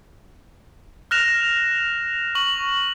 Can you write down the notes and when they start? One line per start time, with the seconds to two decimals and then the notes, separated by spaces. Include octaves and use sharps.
1.11 F6 F#6 A#6 E7 F7
2.35 C#6 F#7